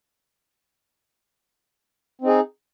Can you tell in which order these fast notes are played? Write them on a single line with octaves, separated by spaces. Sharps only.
C4 D#4 G#4